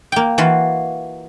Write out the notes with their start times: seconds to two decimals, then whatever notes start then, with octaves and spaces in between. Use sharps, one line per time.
0.12 A#3 G5
0.38 E3 F4 F#4